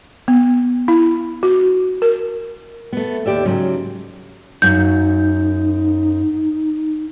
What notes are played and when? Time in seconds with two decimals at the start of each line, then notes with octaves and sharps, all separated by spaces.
0.28 B3
0.88 E4
1.43 F#4
2.02 A#4
2.93 A3 B3
3.26 D#2 C3 G4 D5 E5
3.45 G#2 C#3 F#3
4.62 F#2 A#3 D#4 F#4 G6